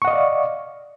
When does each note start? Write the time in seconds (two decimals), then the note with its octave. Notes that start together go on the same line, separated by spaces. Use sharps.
0.02 C#6
0.05 F#5
0.07 D#5
0.10 F5
0.13 D5